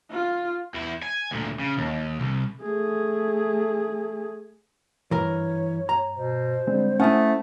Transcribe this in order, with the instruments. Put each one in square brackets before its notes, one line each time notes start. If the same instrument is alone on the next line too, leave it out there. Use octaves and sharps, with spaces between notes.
[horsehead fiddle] F4
[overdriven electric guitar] E2 E4
G#5
D2 A#2
C#3
D#2
C2
[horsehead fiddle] A3 G#4
[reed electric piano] G2 [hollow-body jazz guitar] E3 A#4 [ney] C#5
[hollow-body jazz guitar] A#5
[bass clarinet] B2 [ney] C5
[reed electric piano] D3 G#3 C4 [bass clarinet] G3
[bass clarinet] A3 [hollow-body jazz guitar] C#4 E4 [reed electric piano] F#5 G#5 D#6